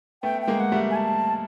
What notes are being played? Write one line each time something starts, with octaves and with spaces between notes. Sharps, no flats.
A3 B3 G5
G5
G#3 A#3
F#5
G3 A3
G#5
A5